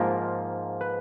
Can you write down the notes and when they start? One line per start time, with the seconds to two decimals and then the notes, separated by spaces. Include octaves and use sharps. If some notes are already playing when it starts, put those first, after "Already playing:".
Already playing: G#2 F3 A#3 F4 A#4
0.81 B4